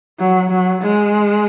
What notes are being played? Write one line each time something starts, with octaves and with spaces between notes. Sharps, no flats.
F#3
F#3
G#3